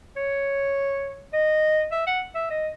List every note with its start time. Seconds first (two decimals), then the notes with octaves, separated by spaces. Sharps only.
0.17 C#5
1.33 D#5
1.92 E5
2.07 F#5
2.35 E5
2.50 D#5